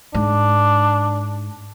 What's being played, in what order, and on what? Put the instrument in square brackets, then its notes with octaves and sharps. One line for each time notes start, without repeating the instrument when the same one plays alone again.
[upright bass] G#2 [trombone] D4